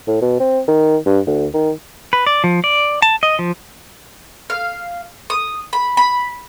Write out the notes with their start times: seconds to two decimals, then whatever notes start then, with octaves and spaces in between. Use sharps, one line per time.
0.08 A2
0.21 B2
0.40 C4
0.68 D#3
1.06 G2
1.27 D2
1.54 D#3
2.13 B4
2.27 D5
2.44 F3
2.64 D5
3.02 A5
3.23 D#5
3.39 F3
4.50 F5
5.30 D#6
5.73 B5
5.97 B5